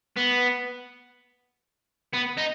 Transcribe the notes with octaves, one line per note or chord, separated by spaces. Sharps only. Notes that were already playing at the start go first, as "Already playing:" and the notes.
B3
B3
D#4